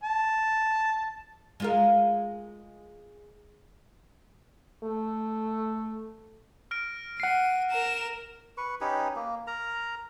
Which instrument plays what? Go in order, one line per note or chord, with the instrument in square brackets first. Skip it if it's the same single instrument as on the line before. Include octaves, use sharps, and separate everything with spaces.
[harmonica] A5
[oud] G#3 F4 A#4
[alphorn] A3
[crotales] F6 A#6 D7
[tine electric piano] F#5 C7 [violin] D#7
[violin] A#4 E7
[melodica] B4 C#6
C#4 D#4 G4 B4
A#3
A#4 A#5